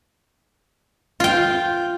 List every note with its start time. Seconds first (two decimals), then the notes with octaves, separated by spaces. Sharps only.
1.20 F4 G5